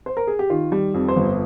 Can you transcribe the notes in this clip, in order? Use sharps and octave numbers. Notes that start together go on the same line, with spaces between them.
C5
A#4
G#4
G4
D#3 F4
G3
F2
C5
G1